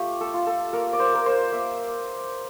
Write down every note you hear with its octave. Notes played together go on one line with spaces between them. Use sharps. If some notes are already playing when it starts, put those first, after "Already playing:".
Already playing: A3 F4 G4
A4
F4
A4
A#3 A#4
D5
C5
A#3 A#4
C5
A#3 E5